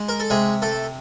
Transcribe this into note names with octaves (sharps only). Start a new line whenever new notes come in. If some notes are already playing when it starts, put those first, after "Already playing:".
Already playing: G#3
A#4
A4
C3 G#3 G#4
A3 A4